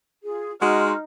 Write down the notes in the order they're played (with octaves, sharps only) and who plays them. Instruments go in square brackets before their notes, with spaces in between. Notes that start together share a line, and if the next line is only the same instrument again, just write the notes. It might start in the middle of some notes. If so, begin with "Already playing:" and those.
[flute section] F4 G#4
[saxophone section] G#3 F#4 [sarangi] D#4 [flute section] D#5 C6 F6